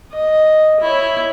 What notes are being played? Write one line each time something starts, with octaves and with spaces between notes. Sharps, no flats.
D#5
E4 C#5